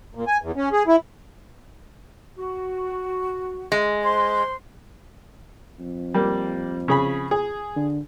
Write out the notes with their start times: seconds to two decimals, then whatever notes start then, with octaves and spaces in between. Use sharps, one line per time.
0.15 A#2
0.28 G#5
0.42 E2
0.57 C#4
0.72 G#4
0.88 E4
2.37 F#4
3.72 G#3
4.03 C5 C6
5.79 F2
6.14 G3 A#3
6.88 C#3 G#4 B5
7.31 G#4
7.76 D3